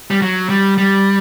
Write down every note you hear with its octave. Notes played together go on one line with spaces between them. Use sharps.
G3
F#3
G3
G3